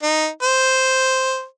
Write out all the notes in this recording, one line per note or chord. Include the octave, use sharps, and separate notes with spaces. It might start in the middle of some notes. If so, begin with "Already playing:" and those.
D#4
C5